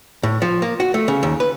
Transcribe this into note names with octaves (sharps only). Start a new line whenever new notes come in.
A2
F3
A#3
F#4
A3
C#3
D#2
B4